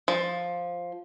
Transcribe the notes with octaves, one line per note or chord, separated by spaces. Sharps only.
F3